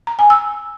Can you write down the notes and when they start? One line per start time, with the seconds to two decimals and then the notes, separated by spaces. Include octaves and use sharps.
0.07 A#5
0.19 G#5
0.30 E6